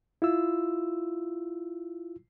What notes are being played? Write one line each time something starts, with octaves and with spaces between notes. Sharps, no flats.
E4 F4 E6